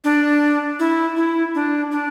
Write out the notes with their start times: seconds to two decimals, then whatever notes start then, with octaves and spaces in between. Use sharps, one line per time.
0.04 D4
0.79 E4
1.17 E4
1.55 D4
1.92 D4